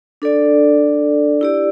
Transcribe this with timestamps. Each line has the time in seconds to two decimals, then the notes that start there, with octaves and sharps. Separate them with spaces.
0.22 D4 A4 D5
1.41 E4 G4 D5